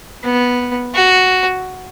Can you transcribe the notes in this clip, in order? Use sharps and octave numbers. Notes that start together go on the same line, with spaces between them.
B3
F#4